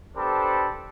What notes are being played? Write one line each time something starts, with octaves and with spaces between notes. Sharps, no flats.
B3 D4 G4 A4 C5 B5